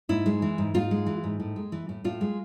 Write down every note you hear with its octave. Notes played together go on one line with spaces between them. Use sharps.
G#2 E4
G#3
E3
G#2
G#2 F4
G#3
E3
G#2
A2
G#3
E3
A2
A2 F4
G#3